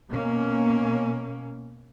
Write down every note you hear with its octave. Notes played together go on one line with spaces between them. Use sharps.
B2 A#3 C#4